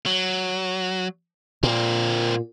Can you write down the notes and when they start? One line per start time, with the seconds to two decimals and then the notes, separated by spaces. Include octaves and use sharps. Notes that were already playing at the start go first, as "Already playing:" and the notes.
0.06 F#3
1.63 A#2 A#3 C4